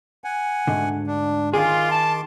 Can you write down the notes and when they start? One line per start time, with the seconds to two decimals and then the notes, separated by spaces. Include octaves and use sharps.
0.24 F#5 G#5
0.67 D2 G#2 D3
1.07 D4
1.54 D#3 F4 G#4 C6 D6
1.91 A5